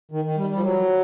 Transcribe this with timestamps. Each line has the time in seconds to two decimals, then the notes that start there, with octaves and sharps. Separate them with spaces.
0.11 D#3
0.25 D#3
0.37 G3
0.50 G3
0.56 F3
0.62 F#3